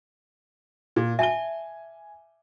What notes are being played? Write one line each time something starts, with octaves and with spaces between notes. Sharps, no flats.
A#2
E5 G#5 A5 G7